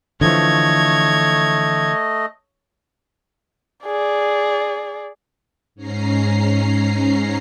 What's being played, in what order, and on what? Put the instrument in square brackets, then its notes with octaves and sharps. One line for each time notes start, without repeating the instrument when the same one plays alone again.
[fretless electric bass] D3 E3 F3 [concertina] A3 D#5 [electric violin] C#5 G#6
[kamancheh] G#4 D5
[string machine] G#2 C#4 A#5 C7